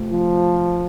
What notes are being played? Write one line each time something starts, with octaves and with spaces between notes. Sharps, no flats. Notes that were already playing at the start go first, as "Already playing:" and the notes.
Already playing: C3 A3 F4
F3